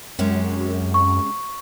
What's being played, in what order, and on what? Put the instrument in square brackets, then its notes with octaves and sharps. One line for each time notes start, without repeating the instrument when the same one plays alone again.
[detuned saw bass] F#2 [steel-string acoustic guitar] C3 G#3 C#4
[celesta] C#6